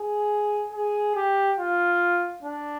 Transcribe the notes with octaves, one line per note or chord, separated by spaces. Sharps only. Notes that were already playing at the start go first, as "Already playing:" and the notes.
Already playing: G#4
G#4
G4
F4
D4